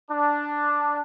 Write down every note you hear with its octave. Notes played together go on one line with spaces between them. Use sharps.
D4